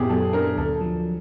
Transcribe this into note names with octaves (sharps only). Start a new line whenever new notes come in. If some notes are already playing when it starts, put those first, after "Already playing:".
Already playing: F#2 A#2 B3 E4 G4 G#4
F#3 A4
D4 A#4
D2 A4
F3